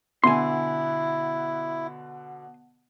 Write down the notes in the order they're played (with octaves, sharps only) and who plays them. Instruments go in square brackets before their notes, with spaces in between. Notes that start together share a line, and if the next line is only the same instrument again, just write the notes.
[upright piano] B2 D3 [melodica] E4 [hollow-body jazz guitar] G#5 C6